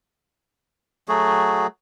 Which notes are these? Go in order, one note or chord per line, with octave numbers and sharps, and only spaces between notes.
F#3 A3 F#4 G#4